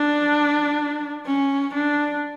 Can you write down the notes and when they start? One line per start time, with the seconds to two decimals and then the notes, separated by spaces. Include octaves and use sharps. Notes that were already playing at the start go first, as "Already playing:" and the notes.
Already playing: D4
1.26 C#4
1.74 D4